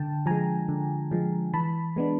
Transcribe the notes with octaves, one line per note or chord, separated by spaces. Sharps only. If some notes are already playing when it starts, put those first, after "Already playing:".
Already playing: D3 G5 A5
F3 G#3 G#5 A#5
D3
F3 G#3
E3 A5 B5
G#3 B3 D4